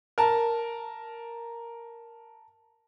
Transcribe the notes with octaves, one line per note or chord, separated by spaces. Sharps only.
A#4 A5